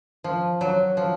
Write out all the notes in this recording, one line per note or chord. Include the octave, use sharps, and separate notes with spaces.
F3
F#3
F3